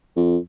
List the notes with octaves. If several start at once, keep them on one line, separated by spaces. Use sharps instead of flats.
F2